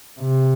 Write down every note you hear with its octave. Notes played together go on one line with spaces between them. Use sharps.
C3